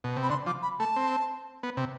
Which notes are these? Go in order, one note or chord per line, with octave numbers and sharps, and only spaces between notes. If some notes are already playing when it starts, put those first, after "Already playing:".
B2
C3
B5
D3 C6
F3 D6
B5
A3 A5
C4
B3
C3